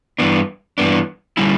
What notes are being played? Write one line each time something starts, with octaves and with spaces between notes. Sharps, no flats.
G2 E3 B3 D4
G2 E3 B3 D4
D3 G3 C#4 E4